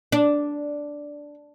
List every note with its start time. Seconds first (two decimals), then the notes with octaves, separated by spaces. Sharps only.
0.12 D4